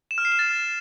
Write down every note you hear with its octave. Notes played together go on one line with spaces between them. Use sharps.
E7
F6
C7
E7
A6